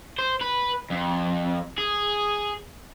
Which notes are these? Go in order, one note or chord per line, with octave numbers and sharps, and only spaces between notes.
C5
B4
F2
G#4